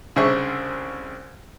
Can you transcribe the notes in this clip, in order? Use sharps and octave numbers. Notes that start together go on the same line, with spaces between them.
C2 C#3 D4 C5 E5 C#6